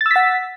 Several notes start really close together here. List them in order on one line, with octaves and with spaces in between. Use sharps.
A6 E6 B6 F#5